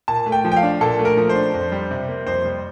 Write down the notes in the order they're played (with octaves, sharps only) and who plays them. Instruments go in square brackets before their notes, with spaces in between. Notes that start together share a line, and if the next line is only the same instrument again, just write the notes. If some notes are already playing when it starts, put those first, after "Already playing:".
[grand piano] A#2 A5
A3
G5
F3
G5
F5
D4
A#2 A4
A3
A#4
F3
C5
D4
F2
G3
C3
A#3
F2 C5
G3